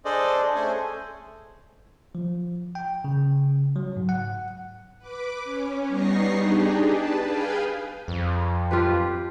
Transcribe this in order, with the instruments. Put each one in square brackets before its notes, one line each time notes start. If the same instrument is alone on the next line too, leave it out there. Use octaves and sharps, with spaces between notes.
[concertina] D4 G#4 A4 C5 D5 D#5
A3 C#4 G#4 A4 C5 G#5
[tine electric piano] F3
G5
C#3
F#3
G#2
F#5
[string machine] B4 D6
C#4
G3 B3 D#4 C#6 A#6 C7
D4 D#4 G4 G#4
B4 A5
G#4 B4 F5 G5 G#5
[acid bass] F2
[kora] F4 G4 B4